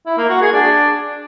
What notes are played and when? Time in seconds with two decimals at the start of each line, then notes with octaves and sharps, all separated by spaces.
0.06 E4
0.18 A#3
0.29 F#4
0.41 G#4
0.53 D4